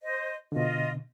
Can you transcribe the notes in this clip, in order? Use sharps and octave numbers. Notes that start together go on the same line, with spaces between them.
C5 D#5
B2 D3 F4 D#5